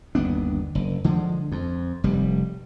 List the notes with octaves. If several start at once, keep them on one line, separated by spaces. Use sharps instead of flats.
G1 D#2 B3 D4
F#1
D3 F3 G#3
F2
F1 G3